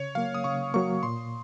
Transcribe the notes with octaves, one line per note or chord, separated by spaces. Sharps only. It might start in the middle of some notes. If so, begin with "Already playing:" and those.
Already playing: C#3 C#5
F#3 A#3 F5
D#6
C#3 C#6
F#3 A#3 C#6
A#2 C6